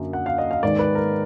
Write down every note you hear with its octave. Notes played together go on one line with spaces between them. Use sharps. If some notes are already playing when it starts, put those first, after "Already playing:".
Already playing: F#2 D3 F#3 A#3
F#5
F5
D#5
F5
G#2 D#3 G#3 B3 D5
B4
A#4